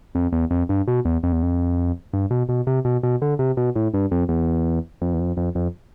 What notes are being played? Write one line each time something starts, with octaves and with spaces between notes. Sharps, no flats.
F2
E2
F2
G2
B2
E2
F2
E2
F2
G2
B2
B2
C3
B2
B2
D3
C3
B2
A2
G2
F2
E2
F2
E2
F2
F2
F2